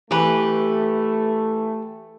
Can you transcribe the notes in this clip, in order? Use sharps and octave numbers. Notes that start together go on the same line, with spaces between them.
E3 A3 G4 B4